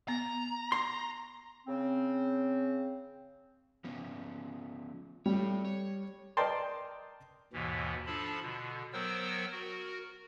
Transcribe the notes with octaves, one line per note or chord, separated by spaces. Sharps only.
B3 A#5
C6
C#3 C4
F3 B3 C#4
G3 A4 C#5
C#5
A#4 D5 D#5 G5 A5 C6
D#2 G#2 B2 E3
F3 D4 F4 A4 A5 B5
B2 D3
F#3 B3 A#4 C5 G5 E6
F#4 A#4